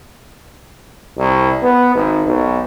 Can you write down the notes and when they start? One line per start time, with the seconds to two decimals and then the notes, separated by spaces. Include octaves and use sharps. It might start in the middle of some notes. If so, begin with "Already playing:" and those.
1.18 C2
1.63 B3
1.95 G#1
2.26 B1